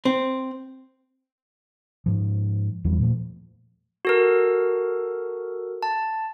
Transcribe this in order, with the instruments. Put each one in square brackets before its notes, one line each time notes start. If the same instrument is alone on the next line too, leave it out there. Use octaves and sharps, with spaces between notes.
[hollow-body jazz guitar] C4
[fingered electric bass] G#2 F3
E2 F3 G3
A#2 F3 G3 A3
[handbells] F#4 A4 A#4
A5